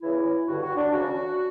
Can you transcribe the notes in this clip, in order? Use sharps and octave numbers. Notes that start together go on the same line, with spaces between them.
E2 C#3 E3 E4
G2 D3 F#4
F#4
D4
D2 C#3 E3 F#4